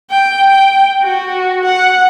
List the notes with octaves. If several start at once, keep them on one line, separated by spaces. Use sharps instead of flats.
G5
G5
F#4
F#5